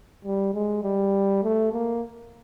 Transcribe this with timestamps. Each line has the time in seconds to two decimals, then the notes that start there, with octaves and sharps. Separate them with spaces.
0.25 G3
0.54 G#3
0.84 G3
1.43 A3
1.73 A#3